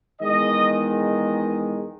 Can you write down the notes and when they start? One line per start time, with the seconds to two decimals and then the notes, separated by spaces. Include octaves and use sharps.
0.20 E2 D#3 G#3 D#5
0.71 D#5